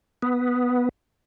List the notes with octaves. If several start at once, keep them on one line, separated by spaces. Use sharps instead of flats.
B3